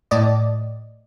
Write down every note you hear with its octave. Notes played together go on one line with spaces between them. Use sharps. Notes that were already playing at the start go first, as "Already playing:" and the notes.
A2 D5 D#5